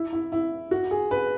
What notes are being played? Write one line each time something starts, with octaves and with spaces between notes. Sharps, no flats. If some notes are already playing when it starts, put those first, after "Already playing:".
Already playing: E4
E4
E4
F#4
G#4
B4